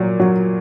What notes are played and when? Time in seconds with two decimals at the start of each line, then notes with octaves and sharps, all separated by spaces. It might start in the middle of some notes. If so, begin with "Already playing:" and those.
Already playing: A#2 F#3
0.20 F#3